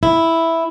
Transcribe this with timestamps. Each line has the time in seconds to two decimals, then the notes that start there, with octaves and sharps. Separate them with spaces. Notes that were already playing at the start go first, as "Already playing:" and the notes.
0.03 E4